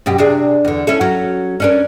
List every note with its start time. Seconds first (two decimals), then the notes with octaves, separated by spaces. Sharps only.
0.06 F#2 B2 G4
0.18 C3 D4 G#4
0.65 E2 D3
0.87 C#4 E4 A4
1.01 F#3 C#4
1.60 C#4 D4 A#4